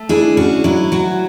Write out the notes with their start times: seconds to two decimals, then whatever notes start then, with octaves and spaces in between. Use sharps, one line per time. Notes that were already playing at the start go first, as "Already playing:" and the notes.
Already playing: A3
0.09 D4 E4 G#4
0.37 C#4 F#4
0.64 F#3 E4
0.92 F#3 F#4